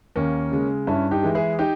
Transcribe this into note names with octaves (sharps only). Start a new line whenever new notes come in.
D#2 A#3 C#4
C#3 G#3
G2 C#4 E4
D#4 G4
E3 G#3
E4 G#4
D#4 G4